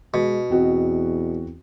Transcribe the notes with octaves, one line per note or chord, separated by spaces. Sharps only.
B2 G#3
E2 C4 F#4 D#5